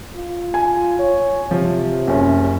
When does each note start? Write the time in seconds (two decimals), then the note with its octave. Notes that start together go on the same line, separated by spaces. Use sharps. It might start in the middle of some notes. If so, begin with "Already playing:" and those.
0.15 F4
0.54 G#5
0.99 C#5
1.51 C3 F3
2.07 F#1 C#4